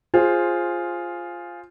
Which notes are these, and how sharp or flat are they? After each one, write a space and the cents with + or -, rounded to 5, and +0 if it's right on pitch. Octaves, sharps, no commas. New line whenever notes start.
F4 +0 G#4 +0 C5 +10